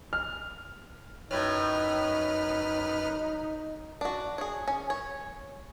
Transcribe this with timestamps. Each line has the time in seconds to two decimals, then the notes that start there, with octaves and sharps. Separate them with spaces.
0.13 F6
1.31 F#2 A2 D#4 B4 C#5 F6
4.01 D4 F#4
4.38 G#4 C#5
4.68 C#4
4.90 C#5